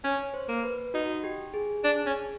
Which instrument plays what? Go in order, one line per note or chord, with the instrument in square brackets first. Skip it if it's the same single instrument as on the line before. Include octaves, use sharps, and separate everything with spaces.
[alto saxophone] C#4 [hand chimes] C#5
[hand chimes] C5
[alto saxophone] A#3
[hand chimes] B4
[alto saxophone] D#4 [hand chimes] F#4
[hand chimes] G4
G#4
[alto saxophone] D4
C#4